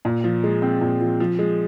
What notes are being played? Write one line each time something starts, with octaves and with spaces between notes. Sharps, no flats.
A#2
F3
G#3
C4
A#2
F3
F3
G#3